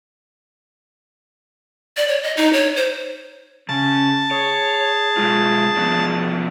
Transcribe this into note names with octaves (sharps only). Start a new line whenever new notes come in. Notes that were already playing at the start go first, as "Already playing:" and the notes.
D5
C#5
D#5
D#4
C#5
C5
C#3 C#4 A5
G#4 C#5
B2 G#3 F4
F3 B3 D4